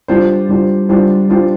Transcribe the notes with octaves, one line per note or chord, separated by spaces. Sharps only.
G3 D4 F4 C5
G3 D4 F4 C5
G3 D4 F4 C5
G3 D4 F4 C5